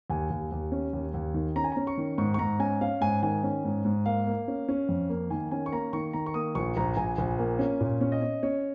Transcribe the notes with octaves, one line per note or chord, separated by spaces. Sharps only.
D#2 G#5
D#2
D#2
C#4
D#2
D#2
D#3
C#4 A#5
G#5
C#4 A#5
C#6
D#3
G#2 C#6
C#6
G#2 A#5
C#4 G#5
C#4 F5
G#2 G#5
D#3 G#5
C#4
G#2
G#2
A#3 F5
A#3
C#4
C#4
F2
A#3
D#3 G#5
C#4 G#5
C#6
A#3 A#5
D#3 C#6
D#3 A#5
C#6
A#3 D#6
A#1 C#6
A#1 A#5
A#1 G#5
A#1
A#3
C#4
A#2
C#4
D#5
C#4
C#4 C#5